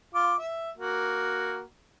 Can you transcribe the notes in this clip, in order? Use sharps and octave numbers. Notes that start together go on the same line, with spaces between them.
F4 D6
E5
A#3 F#4